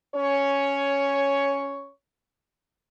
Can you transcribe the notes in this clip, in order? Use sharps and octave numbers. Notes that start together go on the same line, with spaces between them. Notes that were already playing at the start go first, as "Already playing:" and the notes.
C#4 C#5